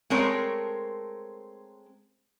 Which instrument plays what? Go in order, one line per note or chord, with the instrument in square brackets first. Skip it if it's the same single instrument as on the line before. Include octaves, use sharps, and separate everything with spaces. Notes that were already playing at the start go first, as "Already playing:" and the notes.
[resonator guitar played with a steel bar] G#3 A3 C4 A#4 C#5